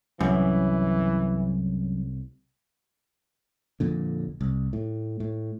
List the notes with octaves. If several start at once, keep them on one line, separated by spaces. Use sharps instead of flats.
C2 F#2 A2 E3
A#1 F2 A#2 D3
C2
A2
A2